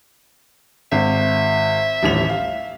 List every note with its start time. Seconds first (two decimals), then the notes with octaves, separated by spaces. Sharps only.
0.92 G#1 E5
2.03 D#1 A1 F7
2.29 F5